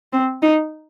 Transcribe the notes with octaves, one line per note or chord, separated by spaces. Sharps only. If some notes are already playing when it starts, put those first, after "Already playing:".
C4
D#4